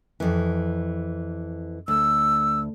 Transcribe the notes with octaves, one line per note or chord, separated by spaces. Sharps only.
F2 E3
D2 E6